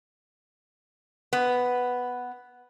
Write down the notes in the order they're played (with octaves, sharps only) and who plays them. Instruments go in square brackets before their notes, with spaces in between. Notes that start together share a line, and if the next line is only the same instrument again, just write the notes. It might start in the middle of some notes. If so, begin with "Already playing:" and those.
[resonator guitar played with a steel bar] B3